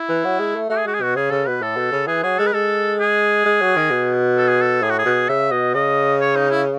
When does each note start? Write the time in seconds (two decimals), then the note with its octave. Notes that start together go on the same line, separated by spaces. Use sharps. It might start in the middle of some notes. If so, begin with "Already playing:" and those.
Already playing: E4
0.09 E3
0.24 F#3
0.39 G#3
0.55 A3
0.70 A3 F#4
0.78 G#4
0.86 G#3 F#4
0.94 G#4
1.01 B2 F#4
1.16 C#3 G#4
1.31 C#3 A4
1.47 B2 B4
1.62 A2 A4
1.77 B2
1.92 C#3
2.07 E3 G#4
2.23 F#3 G#4
2.39 G#3 A4
2.46 B4
2.54 G#3 A4
3.00 G#4
3.46 G#3
3.61 F#3
3.76 D#3
3.91 B2
4.37 A4
4.49 G#4
4.61 A4
4.82 A2 G#4
4.90 F#4
4.99 G#4
5.05 B2
5.29 C#3 E5
5.51 B2 D#5
5.74 C#3 D#5
6.21 C#5
6.36 D#4
6.51 E4